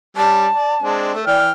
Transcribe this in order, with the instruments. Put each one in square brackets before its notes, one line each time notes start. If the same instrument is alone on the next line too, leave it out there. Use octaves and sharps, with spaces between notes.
[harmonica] G3 C#4 [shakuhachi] A5
[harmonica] D5
G#3 C4 D4
[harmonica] A3 [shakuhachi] A4
[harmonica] E3 G5 F6 [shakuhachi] D5